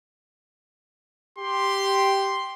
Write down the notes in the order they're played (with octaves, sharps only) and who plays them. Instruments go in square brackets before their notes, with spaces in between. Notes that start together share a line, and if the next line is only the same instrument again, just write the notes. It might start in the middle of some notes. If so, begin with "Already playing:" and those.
[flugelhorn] G4 [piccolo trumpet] C6